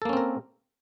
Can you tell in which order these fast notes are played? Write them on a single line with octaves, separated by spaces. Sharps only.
A4 A#3 C#4 C4 A#4